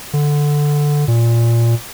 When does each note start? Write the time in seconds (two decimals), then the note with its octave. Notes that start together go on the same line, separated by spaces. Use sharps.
0.13 D3
1.08 A#2